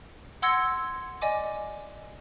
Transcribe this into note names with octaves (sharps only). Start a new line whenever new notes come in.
F#5 C6 E6 G#6 A#6 C#7
D5 D#5 G#5 D6